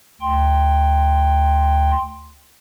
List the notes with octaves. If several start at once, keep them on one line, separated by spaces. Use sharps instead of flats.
D2 G5 C6